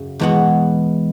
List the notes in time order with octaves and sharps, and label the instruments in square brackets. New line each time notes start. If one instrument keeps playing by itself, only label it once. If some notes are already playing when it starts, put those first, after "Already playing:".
Already playing: [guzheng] F#2 C#3
[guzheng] E2 B2 B3 F#4 [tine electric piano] E3 G#3